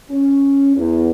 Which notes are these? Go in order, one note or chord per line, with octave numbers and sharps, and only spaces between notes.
C#4
E2